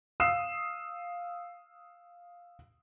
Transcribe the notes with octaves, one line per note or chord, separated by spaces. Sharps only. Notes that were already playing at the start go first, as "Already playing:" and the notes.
F5 D#6 E6 C7 E7